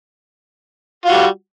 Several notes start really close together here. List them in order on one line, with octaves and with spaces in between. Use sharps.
F4 F#4 G3